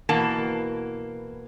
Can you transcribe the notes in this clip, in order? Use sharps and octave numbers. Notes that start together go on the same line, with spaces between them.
B2 E3 A#3 A5